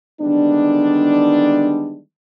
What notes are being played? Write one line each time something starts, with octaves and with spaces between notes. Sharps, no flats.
D3 D#3 G3 G#3 B3 D4